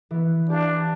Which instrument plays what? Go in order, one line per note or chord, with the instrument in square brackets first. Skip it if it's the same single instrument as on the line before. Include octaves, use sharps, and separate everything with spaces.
[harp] E3 B3
[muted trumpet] D4 [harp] G4 F5